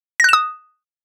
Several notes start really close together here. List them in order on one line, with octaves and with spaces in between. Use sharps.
A#6 F#6 E7 D#6